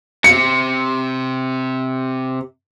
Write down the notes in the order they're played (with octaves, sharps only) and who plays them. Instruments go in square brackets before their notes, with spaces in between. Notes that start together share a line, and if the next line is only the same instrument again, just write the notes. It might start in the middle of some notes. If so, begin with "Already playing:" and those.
[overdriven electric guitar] C3 [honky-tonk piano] C#7